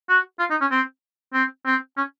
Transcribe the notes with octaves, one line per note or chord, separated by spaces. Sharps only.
F#4
F4
D#4
C#4
C4
C4
C4
C#4